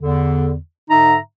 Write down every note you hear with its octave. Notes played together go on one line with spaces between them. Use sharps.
E2 D3
G#2 D3 D#4 E5 A#5